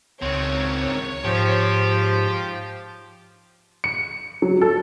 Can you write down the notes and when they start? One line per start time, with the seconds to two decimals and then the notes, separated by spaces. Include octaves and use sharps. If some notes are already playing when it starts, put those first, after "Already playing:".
0.22 C#2 D#3 C4 C#5
1.25 G#2 F3 G4
3.84 C#7
4.42 F#3
4.61 A4